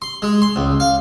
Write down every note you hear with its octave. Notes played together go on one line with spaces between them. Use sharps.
C6
G#3
C6
C#2
F5